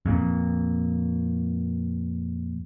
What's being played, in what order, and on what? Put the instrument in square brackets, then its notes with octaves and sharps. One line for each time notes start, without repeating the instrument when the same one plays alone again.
[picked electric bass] F2 A#2